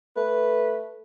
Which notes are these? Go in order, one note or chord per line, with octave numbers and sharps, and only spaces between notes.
A3 B4